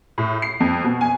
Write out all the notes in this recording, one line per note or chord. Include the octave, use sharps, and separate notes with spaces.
A2
C7
F2
B2
G#5